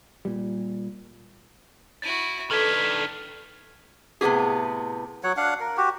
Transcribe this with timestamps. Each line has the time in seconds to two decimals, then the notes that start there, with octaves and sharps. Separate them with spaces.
0.25 A#2 G3
2.02 E4 F#4 A6 D#7
2.51 D#3 D4 A4 B4 F6 G#6 B6
4.21 A2 C3 B3 G4 G#4
5.24 F#3 C#5 F#5
5.37 D4 F5 F#5
5.60 A#4
5.77 F#4 G4